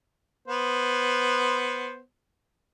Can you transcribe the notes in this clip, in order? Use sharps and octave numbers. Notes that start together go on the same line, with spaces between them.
B3 C5